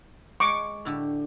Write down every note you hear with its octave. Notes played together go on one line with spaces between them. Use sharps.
G#3 C#6 D6
A2 D3 G4